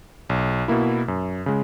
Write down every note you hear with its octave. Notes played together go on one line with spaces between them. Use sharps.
B1
B2 A#3 E4
F#2
C#3 G#3